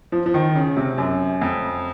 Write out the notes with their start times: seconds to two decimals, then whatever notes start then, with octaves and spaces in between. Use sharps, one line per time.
0.12 F3
0.26 F3
0.34 D#3
0.55 C#3
0.77 C3
0.98 F#2
1.41 F2